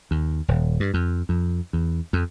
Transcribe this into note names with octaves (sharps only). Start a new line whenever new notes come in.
D#2
D#1
G2
F2
F2
E2
F2